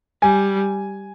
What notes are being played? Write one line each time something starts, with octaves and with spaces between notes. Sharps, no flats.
G3 G#5